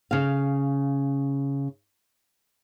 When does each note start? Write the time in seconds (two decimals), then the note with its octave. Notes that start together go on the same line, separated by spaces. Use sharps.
0.11 C#3 F5